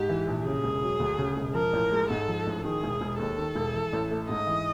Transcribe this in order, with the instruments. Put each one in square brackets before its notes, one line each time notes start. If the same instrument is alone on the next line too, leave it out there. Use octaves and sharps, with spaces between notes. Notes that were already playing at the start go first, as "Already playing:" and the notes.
Already playing: [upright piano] G#2 [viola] G4
[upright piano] E3
A#1
[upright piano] C#3 [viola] G#4
[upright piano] E1
F#3
D2
C#3
E1
[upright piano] F3 [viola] A#4
[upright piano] A1
G#3
[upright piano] G#2 [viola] A4
[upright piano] F3
A1
[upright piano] D#3 [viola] G#4
[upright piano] E1
E1
[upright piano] D#2 [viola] A4
[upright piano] D#3
E1
E3
A1
A3
[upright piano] G#2 [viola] D#5
[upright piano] E3